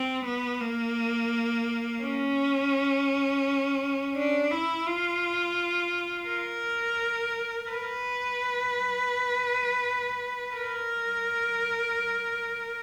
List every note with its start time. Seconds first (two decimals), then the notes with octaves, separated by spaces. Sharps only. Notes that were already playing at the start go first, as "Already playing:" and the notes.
Already playing: C4
0.25 B3
0.61 A#3
2.03 C#4
4.16 D4
4.51 E4
4.87 F4
6.28 A#4
7.70 B4
10.55 A#4